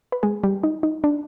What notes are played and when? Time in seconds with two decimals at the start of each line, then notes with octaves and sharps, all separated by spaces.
0.12 B4
0.23 G#3 G#4
0.44 G3 G4
0.63 D#4
0.83 D#4
1.04 D4